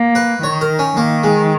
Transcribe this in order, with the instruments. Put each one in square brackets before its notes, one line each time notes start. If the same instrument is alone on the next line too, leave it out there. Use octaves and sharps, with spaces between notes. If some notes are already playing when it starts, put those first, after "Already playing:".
Already playing: [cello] A#3
[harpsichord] B4
[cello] D#3 [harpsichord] C#5
[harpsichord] A#4
C#4
[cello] D#3 [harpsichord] A#3
[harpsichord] G#3